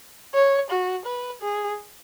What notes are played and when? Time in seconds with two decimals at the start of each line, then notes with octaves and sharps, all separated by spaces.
0.34 C#5
0.71 F#4
1.06 B4
1.42 G#4